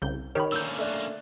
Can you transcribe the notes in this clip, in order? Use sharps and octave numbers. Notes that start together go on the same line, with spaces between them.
C2 C#3 G6
D#3 G4 A#4 C#5 B5
D3 A#3 C#4 E6 G6
A3 D5 F#6